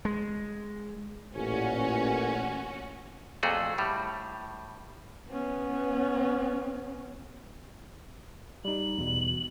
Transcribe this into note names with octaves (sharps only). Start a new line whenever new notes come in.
G#3
A1 A#2 C#4 F#4
F2 A#2 A3 F#4 G#4
A2 G3
B3 C#4
G3 D#4 F#7
E2 B2